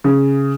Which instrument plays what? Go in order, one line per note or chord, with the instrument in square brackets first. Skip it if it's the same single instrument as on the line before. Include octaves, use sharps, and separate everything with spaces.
[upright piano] C#3